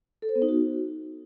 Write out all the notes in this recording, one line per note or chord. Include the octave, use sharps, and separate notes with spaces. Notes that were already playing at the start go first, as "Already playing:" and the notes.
A4
C5
B3
D#4
F#4